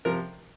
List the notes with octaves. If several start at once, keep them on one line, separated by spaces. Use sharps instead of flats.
C3 F3 A#4